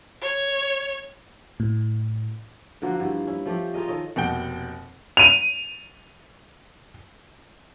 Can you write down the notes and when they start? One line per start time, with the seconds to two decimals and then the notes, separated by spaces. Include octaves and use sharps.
0.22 C#5
1.60 A2
2.82 D3 F3 A#3 F#4
2.99 G2 E3 F3
3.27 C#4 E4
3.46 F3 A3 G4
3.74 F4 G#4 A#4 D#5
3.88 D#3 A4 C#5 D#5
4.16 F1 B2 A#3 F#5 G5 G7
5.17 D#7 F7